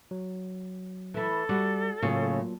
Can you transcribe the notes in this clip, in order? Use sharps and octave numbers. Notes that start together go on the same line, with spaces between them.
F#3
E3 E4 A4
G3 F#4 D6
A2 C#3 F#3 A#3 F4